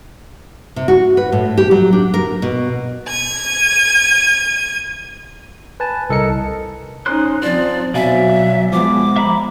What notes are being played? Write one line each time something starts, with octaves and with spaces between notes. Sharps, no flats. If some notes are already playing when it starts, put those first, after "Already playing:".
C3
F#4
B4
A2
G4
F#3
D4
A#4
B2
G#6 D#7
B4 G#5 A5
C2 A4 A#4 D#5 C#7
C#4 D#4 C5 C6 F#6
F3 C4 F4 C5 D5
B2 F#3 D5 E5 F5 G#5
F3 G#3 B3 D6
E5 A#5 B5